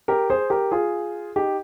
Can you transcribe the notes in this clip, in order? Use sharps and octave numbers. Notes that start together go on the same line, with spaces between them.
G4 A#4
G#4 C5
G4 A#4
F4 G#4
D#4 G4